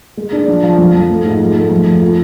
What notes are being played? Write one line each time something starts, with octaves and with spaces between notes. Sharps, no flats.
G#3
D4
F3
F3
F2
F2
A3
G#2
F3
A3
F2
F2
F4